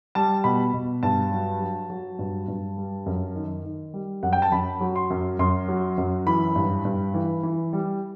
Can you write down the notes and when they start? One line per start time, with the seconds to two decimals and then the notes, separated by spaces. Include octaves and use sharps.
0.15 G3 A5
0.44 B2 B5
0.74 B2
1.03 G2 A5
1.32 F#3
1.61 F#3
1.90 F#3
2.19 G2
2.48 G2
2.77 G3
3.06 F#2
3.35 D#3
3.64 D#3
3.94 G3
4.23 F#2 F#5
4.33 G5
4.42 A5
4.52 F#2 B5
4.81 F#3
4.96 C6
5.10 F#2
5.39 F#2 C6
5.68 F#3
5.98 F#2
6.27 E3 B5
6.56 G2
6.85 G2
7.14 E3
7.43 E3
7.73 G3